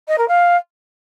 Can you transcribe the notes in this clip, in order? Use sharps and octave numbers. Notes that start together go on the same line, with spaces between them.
D#5
A#4
F5